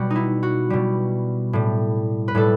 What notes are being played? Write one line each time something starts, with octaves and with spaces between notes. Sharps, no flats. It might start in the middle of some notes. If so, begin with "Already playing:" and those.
Already playing: B2 G3 F#4
D#4
E4
F#4
B2 G3
A2 G3
B4
A2 G3 A4